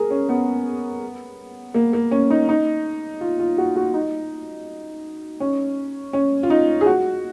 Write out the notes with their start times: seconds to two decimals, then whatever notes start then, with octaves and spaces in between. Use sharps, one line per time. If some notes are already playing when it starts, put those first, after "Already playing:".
Already playing: G#4 A#4
0.11 C#4
0.29 B3
1.74 A#3
1.93 A#3
2.11 C#4
2.30 D#4
2.49 D#4
3.21 F4
3.39 F4
3.58 F#4
3.76 F#4
3.94 D#4
5.40 C#4
6.13 C#4
6.43 F4
6.50 D#4
6.81 G#4
6.86 F#4